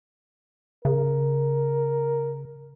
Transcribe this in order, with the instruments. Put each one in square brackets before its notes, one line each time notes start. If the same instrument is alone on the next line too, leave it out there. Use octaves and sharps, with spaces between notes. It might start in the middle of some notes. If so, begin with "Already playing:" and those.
[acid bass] C#3 [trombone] A#4